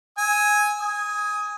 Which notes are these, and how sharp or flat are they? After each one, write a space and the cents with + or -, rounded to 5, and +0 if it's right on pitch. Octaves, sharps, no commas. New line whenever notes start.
G#5 +0 E6 -40
G#5 -10 D#6 +20